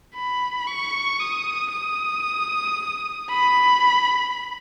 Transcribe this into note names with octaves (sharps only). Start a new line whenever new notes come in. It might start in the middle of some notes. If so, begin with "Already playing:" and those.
B5
C#6
D#6
D#6
B5